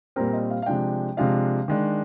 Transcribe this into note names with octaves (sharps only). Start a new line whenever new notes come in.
A#2 G3 C4 A#4
D#5
F5
F5
C3 F3 G#3 D4 G5
C3 F3 G#3 D4 F5
D#3 G#3 D4